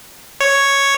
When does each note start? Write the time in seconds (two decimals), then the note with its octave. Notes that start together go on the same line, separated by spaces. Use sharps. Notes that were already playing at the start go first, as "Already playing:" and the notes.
0.41 C#5